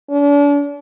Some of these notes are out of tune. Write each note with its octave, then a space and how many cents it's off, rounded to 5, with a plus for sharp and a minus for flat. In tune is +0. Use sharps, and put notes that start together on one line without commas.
D4 -40